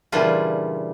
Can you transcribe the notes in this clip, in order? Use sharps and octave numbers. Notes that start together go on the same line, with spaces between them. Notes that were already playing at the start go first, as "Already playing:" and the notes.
A#2 C#3 E3 G3 D4 F4